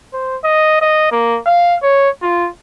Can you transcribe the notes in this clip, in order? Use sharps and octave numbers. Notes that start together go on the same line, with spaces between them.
C5
D#5
D#5
A#3
F5
C#5
F4